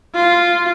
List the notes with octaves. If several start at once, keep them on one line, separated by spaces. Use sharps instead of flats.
F4